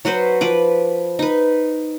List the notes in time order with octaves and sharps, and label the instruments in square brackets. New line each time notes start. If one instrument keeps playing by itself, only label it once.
[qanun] F#3 F#4 B4 C5
F3 B4 D6
D#4 B4